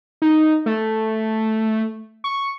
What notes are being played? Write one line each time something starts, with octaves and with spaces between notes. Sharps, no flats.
D#4
A3
C#6